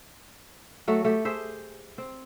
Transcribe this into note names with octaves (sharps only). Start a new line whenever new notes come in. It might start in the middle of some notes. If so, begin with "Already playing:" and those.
F#3 A3 F#4
A3 G4
G4 G#4 C5 E5
C4